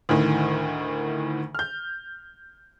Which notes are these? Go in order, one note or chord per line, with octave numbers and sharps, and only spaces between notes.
D2 A2 D#3
F6 G6